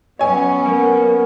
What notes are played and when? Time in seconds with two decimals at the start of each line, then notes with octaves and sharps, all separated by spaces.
0.19 F#3 B3 C#4 C#5 G#5
0.66 A#3